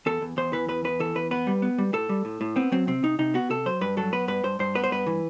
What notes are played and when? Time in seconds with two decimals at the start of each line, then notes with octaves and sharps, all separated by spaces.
0.06 E2 A4
0.22 E2
0.37 E2 C5
0.53 E3 B4
0.69 E2 B4
0.84 E2 B4
1.00 E3 A4
1.15 E2 B4
1.31 B3 B4
1.47 G3
1.62 B3
1.78 G3
1.93 A2 A4
2.09 G3
2.25 A2
2.41 A2
2.56 B3 C4
2.72 F#3 C4
2.87 C3 C4
3.03 C3 D#4
3.19 C3 D#4
3.34 B3 F#4
3.50 C3 A4
3.66 F#3 C5
3.81 G2 B4
3.97 F#3 A4
4.13 B3 B4
4.28 G2 B4
4.44 G2 C5
4.59 G2 C5
4.75 B3 B4
4.84 C5
4.91 G2 B4
5.06 E3